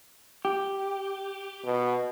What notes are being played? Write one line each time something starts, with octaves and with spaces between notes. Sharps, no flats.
G4
B2